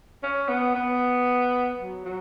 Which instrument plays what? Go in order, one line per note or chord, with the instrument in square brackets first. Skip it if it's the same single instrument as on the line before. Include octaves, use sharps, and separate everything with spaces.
[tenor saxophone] C#4
B3
B3
F#3
F#3